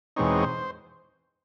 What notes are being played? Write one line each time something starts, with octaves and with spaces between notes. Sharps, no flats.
E2 B2 G#3 C4 D#4 C#5
C5